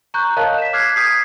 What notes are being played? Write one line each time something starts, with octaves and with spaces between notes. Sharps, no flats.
A#5 C#6 F#6 G6
A#4 C#5 D#5 F5 A5 F#6
B6 E7
D6 F6 F#6 G#6 B6 C7
D#6 G6 G#6 B6 C7